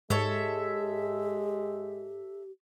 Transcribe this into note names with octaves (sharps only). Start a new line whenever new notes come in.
G#2 G#3 G4 A4 C#5 E5